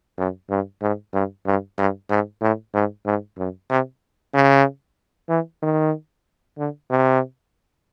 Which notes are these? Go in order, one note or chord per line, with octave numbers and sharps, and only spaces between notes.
F#2
G2
G#2
G2
G2
G2
G#2
A2
G#2
G#2
F#2
C3
C#3
E3
D#3
D3
C3